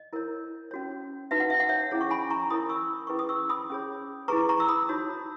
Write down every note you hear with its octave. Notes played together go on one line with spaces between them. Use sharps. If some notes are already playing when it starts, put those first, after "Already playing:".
Already playing: D#5
E4 A#4 C#5
C#4 F#4 C#5
D#4 F#4 B4 E5
F#5
E5
F#5
C#5 E5
C#4 E4 G#4 C#5
C#6
G#5 B5
A#5 C#6
E4 A#4 C#5 B5 D#6
C#6 E6
C#4 E4 G#4 B4 C#6
D#6
C#6 E6
B5 D#6
C#4 G#4 C#5
E4 G#4 B4 A#5 C#6
A#5 C#6
E6
B5 D#6
D#4 F#4 C#5